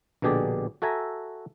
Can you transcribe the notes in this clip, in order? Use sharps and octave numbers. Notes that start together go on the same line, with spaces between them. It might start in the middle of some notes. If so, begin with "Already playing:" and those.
A#1 B2 D3 G4 G#4 D5
F#4 A4 E5 G#5 A#5